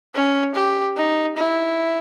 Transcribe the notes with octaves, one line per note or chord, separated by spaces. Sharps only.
C#4
G4
D#4
E4